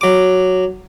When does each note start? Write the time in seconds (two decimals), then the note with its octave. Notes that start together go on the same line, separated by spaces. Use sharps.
0.01 F#3 D6